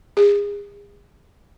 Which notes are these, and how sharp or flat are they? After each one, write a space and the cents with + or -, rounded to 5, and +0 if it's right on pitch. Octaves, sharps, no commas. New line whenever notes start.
G#4 -35